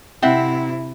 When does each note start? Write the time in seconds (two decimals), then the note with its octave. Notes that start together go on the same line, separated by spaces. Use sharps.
0.22 C3 C4 E4 E5 F#5